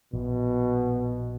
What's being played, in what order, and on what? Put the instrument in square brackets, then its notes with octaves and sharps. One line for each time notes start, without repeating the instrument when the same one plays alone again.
[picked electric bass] A#1 [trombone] B2